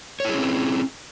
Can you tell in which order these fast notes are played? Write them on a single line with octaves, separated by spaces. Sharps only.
C#5 E4 G#4 C#4 C4